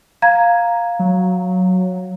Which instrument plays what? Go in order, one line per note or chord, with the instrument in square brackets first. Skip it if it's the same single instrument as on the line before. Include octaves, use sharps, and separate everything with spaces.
[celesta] F5 A#5 G#6
[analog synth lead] F#3